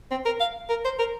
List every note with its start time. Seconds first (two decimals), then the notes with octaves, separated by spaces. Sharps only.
0.11 C4
0.25 A#4
0.40 F5
0.69 A#4
0.84 C5
0.99 A#4